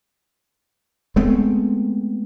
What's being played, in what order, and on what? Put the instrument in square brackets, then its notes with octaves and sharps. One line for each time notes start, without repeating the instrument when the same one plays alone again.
[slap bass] G#3 A3 B3 C4